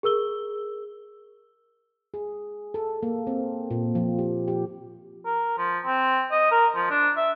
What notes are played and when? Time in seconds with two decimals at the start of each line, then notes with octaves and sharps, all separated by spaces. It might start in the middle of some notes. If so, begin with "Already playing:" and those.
0.03 G#4 A#4 E6 G7
2.14 G#4
2.74 A4
3.03 A#3
3.27 C4
3.71 A#2
3.95 F3
4.19 G4
4.48 G4
5.26 A#4
5.58 F3
5.85 C4
6.31 D#5
6.51 A#4
6.75 F3
6.90 D4
7.17 E5